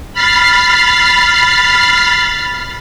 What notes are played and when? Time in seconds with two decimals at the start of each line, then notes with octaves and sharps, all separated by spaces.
0.13 B5 F6 A6 C7